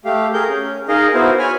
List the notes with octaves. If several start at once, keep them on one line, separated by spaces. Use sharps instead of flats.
A3 G4 F5
G#4 A#4 G6
C#4
D#4 G#4 A#4 D#5 F5
B3 E4 F#4 A#4 C5
C#5 G#5 B5 F6